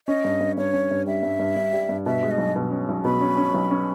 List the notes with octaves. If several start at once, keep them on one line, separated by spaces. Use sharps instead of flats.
C#4 D#5
G2
G2
G2 C#5
C#4
G2
G3 E5
G2
G2
G2
G3
G2
B2 E5
G#3
D#5
B1
B2
C#4
B1
B2 B5
C#4
C#4
B1
C#4